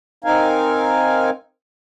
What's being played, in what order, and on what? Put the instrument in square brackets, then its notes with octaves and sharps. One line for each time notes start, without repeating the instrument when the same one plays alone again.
[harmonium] C4 D#4 A#4 F5 G#5